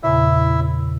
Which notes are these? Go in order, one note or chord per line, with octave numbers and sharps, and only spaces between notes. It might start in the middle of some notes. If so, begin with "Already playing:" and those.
E2 A#2 C#3 E4 E5